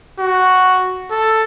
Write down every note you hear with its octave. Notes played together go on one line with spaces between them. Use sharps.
F#4
A4